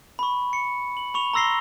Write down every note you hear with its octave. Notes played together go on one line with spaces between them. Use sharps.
B5 C#6
C#7
F#7
B5 C#6 F7
A#5 C6 E6 A#6 C7 G7